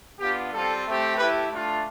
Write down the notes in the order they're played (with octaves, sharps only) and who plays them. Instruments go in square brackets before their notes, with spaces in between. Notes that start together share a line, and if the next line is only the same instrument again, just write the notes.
[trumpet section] B3 D4 F4 G4
G3 C4 F4 A4
A3 C4 G4
A3 E4 G4 B4
A3 D4 F4